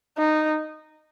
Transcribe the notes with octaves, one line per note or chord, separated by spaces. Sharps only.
D#4